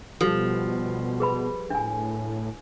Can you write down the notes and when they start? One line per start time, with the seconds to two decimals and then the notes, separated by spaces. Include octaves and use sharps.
0.21 B2 F3 G3 A4
1.20 G#4 B4 B5
1.70 A2 D4 G#5